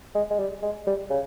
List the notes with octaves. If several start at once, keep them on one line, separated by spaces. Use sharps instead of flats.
G#3
G#3
G3
G#3
G3
C#3